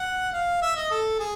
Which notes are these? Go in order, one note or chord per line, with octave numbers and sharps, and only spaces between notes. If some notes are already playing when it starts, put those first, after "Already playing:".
Already playing: F#5
F5
E5
D#5
A4
G#4